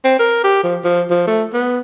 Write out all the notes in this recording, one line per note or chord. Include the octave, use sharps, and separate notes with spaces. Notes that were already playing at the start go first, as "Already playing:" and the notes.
C4
A#4
G4
F3
F3
F3
A3
B3